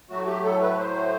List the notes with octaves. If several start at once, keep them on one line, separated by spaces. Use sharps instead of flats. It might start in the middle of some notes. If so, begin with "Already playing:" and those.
A2 F#3 A3 F#4
G4
A4
B4
C5